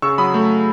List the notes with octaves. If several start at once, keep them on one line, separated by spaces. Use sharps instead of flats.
C#3 C#6 E6
F#3 B5 D#6
A3